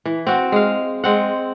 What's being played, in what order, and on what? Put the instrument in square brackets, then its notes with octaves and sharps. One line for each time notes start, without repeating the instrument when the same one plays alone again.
[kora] E3
C4 F#4
G#3 F5
G#3 C4 F#5